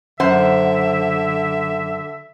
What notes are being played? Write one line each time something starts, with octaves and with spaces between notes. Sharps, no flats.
F#2 D3 C5 E5 F#5